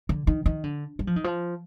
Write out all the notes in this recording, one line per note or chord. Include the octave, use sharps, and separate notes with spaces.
D3
D#3
D#3
D3
G3
F3
D#3
F3